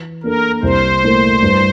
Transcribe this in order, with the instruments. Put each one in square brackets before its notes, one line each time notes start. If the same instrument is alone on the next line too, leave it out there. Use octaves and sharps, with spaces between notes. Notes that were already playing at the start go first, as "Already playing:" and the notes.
Already playing: [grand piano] E3
[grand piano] A#3 D4 A4 [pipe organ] A#4
[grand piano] C2 [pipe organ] C5
[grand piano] A#2 A3 E4 A#4
G2